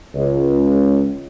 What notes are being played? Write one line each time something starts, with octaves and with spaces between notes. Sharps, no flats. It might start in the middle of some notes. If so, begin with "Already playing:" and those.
C#2